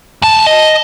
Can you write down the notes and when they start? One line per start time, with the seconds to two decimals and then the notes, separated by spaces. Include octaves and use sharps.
0.22 E2 A5
0.46 D#5